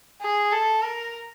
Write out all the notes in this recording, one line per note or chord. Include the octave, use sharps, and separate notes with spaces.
G#4
A4
A#4